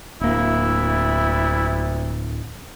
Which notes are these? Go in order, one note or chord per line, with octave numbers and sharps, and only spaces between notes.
D1 D2 A#3 E4